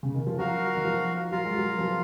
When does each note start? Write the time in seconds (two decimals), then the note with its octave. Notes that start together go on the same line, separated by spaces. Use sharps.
0.03 C#3
0.14 D#3
0.27 F3
0.38 F#3 F#4 A#4 F5
0.75 D#3
0.85 F3
1.32 F#3 F4 A#4 F5
1.45 G#3
1.56 F#3
1.78 F3